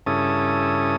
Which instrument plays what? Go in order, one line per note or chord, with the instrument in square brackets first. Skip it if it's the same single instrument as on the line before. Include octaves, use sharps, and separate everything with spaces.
[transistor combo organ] G2 C#3 C#4 E4 A4 D#6